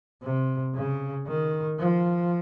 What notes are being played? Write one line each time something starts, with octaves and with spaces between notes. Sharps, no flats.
C3
C#3
D#3
F3